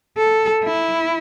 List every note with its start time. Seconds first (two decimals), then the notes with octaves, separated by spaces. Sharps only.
0.17 A4
0.64 E4